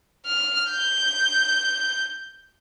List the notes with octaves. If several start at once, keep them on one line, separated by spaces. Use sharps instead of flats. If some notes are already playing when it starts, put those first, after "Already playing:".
F6
G6